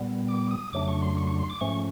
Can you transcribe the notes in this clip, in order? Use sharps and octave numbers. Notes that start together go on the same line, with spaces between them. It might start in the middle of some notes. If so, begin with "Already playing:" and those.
Already playing: A#2 G3 B3
D6
D#6
F2 C#3 F#3 A3 D4 D6
C#6
C6
C#6
C6
C#6
C6
D6
G#2 F3 A3 C#4 C#6